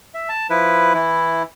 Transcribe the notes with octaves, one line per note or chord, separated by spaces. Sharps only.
E5
A5
F3 E4 B4
E3 E4